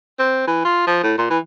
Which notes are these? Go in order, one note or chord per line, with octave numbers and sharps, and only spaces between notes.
C4
E3
F4
F3
A2
A#2
E3